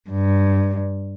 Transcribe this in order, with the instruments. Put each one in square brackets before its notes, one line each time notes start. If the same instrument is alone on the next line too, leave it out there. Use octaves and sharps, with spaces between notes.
[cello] G2